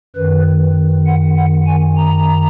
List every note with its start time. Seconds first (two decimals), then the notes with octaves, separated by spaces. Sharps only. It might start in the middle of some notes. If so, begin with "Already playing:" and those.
0.16 F#2 D#3 B4
1.07 F#5
1.36 F#5
1.67 G#5
1.97 A#5